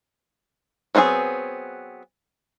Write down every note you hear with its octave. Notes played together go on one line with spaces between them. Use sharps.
F#3 B3 C4 F4 G#4